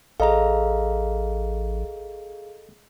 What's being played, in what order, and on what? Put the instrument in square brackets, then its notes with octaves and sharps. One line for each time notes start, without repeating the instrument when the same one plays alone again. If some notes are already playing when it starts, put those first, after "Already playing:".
[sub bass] A1 [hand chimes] G#4 F5 [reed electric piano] A4 D#5 A#5